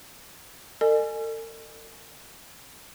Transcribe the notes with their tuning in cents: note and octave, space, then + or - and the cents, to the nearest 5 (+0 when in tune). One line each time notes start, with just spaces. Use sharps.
A4 +45 D#5 -45 G#5 +10